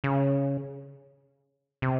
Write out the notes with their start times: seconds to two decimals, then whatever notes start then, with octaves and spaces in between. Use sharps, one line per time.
0.04 C#3
1.82 C3